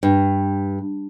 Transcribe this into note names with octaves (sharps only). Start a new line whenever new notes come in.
G2